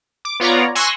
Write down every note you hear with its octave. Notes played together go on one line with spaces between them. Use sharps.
D6
B3 F4 C#5 D5 A#5
G#5 C6 C#6 E6 F#6 A#6